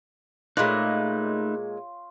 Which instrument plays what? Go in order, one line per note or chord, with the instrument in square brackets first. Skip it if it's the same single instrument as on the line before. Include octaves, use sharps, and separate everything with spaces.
[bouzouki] A#2 G#3 [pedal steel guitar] A3 D#4 [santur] F4 C#5 [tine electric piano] B5 F#6